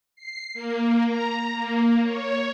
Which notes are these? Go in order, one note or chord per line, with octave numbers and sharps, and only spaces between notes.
C7
A#3
A#5
A#3
C#5